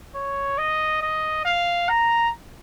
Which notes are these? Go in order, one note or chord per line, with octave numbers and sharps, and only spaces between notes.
C#5
D#5
D#5
F5
A#5